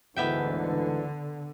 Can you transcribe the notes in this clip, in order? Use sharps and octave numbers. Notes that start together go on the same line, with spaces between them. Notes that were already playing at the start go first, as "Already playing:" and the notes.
D2 G#2 D3 E3 B3 E5 G5